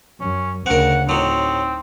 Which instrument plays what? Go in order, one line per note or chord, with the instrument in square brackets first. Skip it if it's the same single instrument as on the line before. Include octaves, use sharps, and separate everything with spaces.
[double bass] F#2 [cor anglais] C#4
[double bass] D2 C#3 [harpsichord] C4 A#4 [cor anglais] F#5
[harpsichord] A2 F#3 [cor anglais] C4 [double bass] D#4